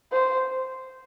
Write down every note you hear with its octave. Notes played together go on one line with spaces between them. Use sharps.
C5